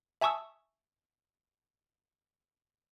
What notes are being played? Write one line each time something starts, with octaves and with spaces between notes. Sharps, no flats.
E5 G#5 A5 C#6 D#6 E6